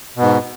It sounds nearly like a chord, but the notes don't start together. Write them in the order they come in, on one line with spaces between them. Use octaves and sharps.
B2 B3 G#2